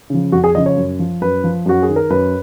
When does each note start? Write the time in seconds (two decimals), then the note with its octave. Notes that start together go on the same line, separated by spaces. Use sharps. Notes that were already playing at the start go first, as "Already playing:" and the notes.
0.10 C#3 F3
0.32 F2 F#4
0.44 G#4
0.55 C#3 F3 D#5
0.66 C#5
0.77 F#2
0.99 F3
1.21 F#2 B4
1.44 F3
1.66 F#2 F#4
1.82 G#4
1.88 D#3
1.96 A#4
2.10 F#2 B4